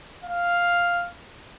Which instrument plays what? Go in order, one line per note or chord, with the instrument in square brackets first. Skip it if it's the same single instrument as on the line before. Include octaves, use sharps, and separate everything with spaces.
[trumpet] F5